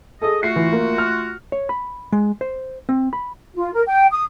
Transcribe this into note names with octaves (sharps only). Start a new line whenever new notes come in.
G#4 A4 D#5
A3 F4 F#4 C7
E3
A#3
F6
C#5
B5
G#3
C5
C4
B5
F4
A#4
G5
D#6